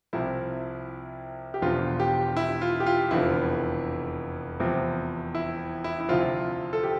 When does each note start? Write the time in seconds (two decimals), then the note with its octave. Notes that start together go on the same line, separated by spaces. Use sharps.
0.13 C2 C3 F3 E4
1.54 G4
1.62 E1 E2 D3 F3 F4
2.00 G4
2.37 E4
2.61 F4
2.80 G4
2.86 F4
3.11 F1 E2 D3 F3 E4
4.60 E2 C3 F3
5.35 E4
5.84 E4
6.00 E4
6.09 D2 C3 F3 F4
6.73 A4
6.83 G4